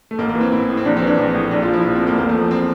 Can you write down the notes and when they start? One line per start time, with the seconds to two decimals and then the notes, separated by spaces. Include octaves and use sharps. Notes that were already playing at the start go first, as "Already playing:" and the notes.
0.11 A3
0.18 A1 A#3
0.29 A#3
0.35 E3
0.41 C4
0.52 A1 E4
0.69 A2
0.77 C4
0.85 A#1 D4
0.97 C4
1.02 E3 D4
1.19 A#1 C4
1.35 A2
1.51 A#1 D4
1.63 F4
1.68 F3
1.73 E4
1.84 A#1
1.95 C4
2.01 A2
2.07 A#3
2.18 E2 A#3
2.29 A3
2.34 F3
2.51 C4